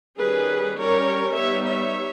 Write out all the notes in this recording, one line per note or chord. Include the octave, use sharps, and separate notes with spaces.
D#3 G3 C#4 G#4 B4
G3 C#4 A#4 C#5
G3 B3 D#4 C#5 E5
C#5 E5